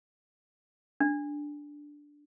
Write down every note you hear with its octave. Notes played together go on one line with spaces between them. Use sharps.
D4